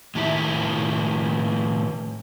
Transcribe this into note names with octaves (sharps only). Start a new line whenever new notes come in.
A2 D#3 E4 G4 E5